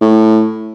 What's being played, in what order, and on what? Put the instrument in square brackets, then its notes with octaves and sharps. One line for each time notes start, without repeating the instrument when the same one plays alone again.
[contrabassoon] A2